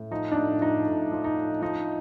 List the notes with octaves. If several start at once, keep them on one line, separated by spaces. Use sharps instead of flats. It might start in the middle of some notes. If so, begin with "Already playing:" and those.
Already playing: A2
F3 D#4
D4
A2 D#4
F3 D#4
A2
F3
D#4
A2
F3 D#4